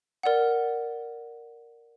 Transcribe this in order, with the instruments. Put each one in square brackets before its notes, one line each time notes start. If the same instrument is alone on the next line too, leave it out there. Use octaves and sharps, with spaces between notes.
[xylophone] A#4 D5 F#5